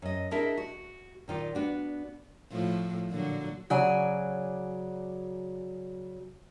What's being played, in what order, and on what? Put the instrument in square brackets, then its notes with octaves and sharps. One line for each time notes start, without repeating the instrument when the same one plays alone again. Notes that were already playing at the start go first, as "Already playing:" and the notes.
[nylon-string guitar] F#2 D#5
D4 E4 G#4 A#4 D#5 E5
F#4
A#2 D#3 F4 D5
B3 D4 F#4
[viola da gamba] A2 F3
A#2 D3 F#3
[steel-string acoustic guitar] C#3 F#3 D5 G#5